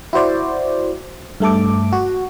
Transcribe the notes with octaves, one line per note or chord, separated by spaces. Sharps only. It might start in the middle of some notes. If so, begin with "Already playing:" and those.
E4 F#4 C5 D5
G2 A3 A4 D6
F#4